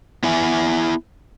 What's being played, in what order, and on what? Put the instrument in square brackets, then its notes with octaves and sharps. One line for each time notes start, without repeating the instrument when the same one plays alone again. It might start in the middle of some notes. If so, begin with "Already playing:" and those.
[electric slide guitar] B3 E4 E5 G#5